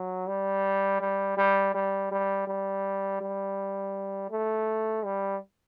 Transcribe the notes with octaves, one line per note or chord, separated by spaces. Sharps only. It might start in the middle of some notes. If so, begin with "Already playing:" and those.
Already playing: F#3
G3
G3
G3
G3
G3
G3
G3
A3
G3